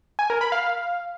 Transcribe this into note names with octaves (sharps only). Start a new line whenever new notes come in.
G#5
A#4
B5
F5